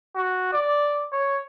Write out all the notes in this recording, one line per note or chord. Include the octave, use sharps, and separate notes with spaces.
F#4
D5
C#5